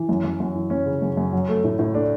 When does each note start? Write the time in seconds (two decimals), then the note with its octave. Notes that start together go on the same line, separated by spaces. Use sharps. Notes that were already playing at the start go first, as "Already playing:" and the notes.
Already playing: E3
0.09 F#2
0.24 F#2
0.40 F#2
0.56 E3
0.70 F#2 C#4
0.86 C#3
1.02 F#2
1.17 F#2
1.33 F#3
1.49 A3
1.64 A2
1.79 A2
1.94 A3 D4